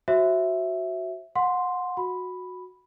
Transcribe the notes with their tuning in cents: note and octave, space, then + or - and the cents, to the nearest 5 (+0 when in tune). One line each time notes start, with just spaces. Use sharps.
F#4 +0 C5 +35 E5 +0
F#5 -30 C6 +0
F#4 -15 B5 +0